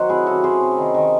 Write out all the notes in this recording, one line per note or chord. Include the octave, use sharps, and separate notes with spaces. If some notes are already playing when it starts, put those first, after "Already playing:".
Already playing: D#3 F#3 F#4 C5
C3 E4 G#4
C#4 F#4 A4
C#4 G#4 C5
C3
D#3
D#3